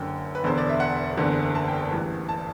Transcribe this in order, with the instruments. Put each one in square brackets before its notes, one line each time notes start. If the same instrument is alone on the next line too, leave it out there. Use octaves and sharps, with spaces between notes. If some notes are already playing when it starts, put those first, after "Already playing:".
Already playing: [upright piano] F#1 F#2 D3 G5
B4
E1 E2 D3 C5
D5
E5
F#5
F#1 E2 D3
A5
G5
A5
A1 G2 E3
A5